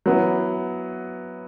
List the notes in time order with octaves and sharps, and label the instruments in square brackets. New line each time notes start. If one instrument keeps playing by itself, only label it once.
[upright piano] F#3 B3 E4